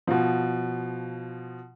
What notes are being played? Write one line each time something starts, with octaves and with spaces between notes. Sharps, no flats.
B2 F3